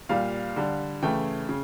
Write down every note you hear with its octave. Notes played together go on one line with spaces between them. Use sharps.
A#2 G3 F5
D3 G3
C#3 E3 A3 G5
C#3